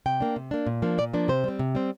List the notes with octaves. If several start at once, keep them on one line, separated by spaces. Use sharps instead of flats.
C3 G5
A#3 D4
C3
A#3 D4
A#2
F3 A#3 D4
A#2 D5
F3 A#3 D4
C3 C5
G3 C4
C3
G3 C4